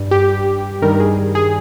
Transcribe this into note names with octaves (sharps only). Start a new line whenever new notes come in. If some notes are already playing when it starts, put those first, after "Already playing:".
Already playing: G2 G3
G4
G2 D#3 G3 A#4
G#4
G#4